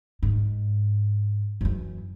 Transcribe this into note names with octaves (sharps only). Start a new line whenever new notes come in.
G#2
F#2 E3